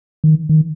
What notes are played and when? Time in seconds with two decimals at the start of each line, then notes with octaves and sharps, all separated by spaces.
0.24 D#3
0.49 D#3